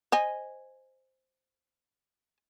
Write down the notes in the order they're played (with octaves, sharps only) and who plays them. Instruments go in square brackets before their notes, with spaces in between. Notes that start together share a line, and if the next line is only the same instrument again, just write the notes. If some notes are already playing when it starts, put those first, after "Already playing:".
[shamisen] C5 D#5 G#5